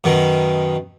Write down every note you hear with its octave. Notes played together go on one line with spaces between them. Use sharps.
F#2 B2 D#3